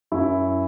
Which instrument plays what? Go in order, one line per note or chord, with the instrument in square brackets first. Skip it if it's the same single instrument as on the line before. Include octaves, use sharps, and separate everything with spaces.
[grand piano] F#2 E4